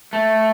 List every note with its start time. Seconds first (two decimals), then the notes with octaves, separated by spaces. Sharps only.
0.13 A3